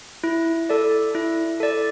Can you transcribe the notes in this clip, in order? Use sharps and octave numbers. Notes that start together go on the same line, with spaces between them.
E4
A4 D5
E4
A4 D5